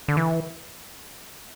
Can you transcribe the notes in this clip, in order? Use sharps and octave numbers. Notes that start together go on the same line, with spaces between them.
D3
E3